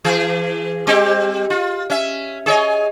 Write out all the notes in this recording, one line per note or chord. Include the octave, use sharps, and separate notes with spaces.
E3 G#4
G3 C4 G4
F4
C#4 E5
G#4 C#5 D#5